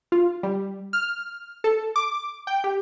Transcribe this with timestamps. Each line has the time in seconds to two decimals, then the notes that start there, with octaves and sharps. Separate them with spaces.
0.12 F4
0.43 G3
0.93 F6
1.64 A4
1.96 D6
2.47 G5
2.64 G4